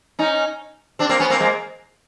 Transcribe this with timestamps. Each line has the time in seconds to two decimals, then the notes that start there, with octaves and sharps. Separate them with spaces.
0.19 C#4 D#4
0.99 C4 D4
1.09 A#3 C4
1.20 B3 C#4
1.30 A#3 C4
1.40 G#3 A#3